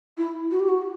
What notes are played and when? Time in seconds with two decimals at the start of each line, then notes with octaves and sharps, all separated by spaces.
0.18 E4
0.51 F#4
0.60 G4
0.68 F#4